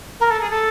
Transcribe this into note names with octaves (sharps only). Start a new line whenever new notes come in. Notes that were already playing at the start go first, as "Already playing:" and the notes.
A#4
A4
G#4
A4